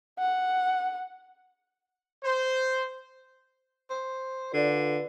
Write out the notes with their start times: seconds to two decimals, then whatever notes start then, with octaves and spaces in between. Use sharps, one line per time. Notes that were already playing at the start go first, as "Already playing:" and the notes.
0.19 F#5
2.25 C5
3.89 C5
4.53 D3 F4 B4 D5